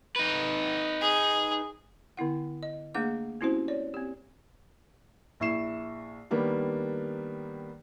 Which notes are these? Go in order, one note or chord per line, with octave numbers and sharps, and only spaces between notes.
D#4 B4
G#4
D3 B3 E4 F#5
D#5
A3 A#3 D4 G#4 F#5 D6
C4 C#4 E4 F#4 G4 C5
C#5 D5
C4 G4
A#1 E4 C#6 C7 E7
D#3 G3 A#3 B3 D4